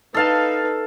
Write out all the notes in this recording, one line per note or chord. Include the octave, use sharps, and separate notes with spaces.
D#4 A4 B4 F5 A5